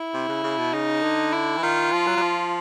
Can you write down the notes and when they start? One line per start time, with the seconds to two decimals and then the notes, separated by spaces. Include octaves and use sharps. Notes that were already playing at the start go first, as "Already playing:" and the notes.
Already playing: E4
0.14 C3
0.29 C#3
0.43 C#3
0.58 B2
0.73 C#3 D#4
1.03 D3
1.32 E4
1.58 E3
1.62 D#3 F4
1.93 F3
2.07 F#3
2.17 F#3
2.22 F3